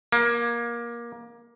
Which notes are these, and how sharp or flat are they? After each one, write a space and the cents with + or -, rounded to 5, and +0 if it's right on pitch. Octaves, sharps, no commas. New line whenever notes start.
A#3 +20